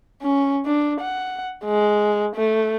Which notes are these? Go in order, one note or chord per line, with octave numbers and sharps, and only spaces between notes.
C#4
D4
F#5
G#3
A3